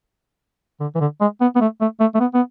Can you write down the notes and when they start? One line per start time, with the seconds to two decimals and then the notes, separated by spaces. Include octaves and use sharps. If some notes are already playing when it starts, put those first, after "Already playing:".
0.80 D3
0.95 E3
1.01 D3
1.21 G#3
1.41 B3
1.56 B3
1.61 A3
1.81 A3
2.00 A3
2.15 A3
2.20 B3
2.34 B3